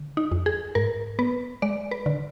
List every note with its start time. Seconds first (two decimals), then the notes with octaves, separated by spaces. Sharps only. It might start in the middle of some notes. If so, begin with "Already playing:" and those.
Already playing: D3
0.17 D#4
0.31 F2
0.46 G#4
0.75 G#2 A#4
1.19 B3 B4
1.62 G#3 D5
1.91 B4
2.06 D3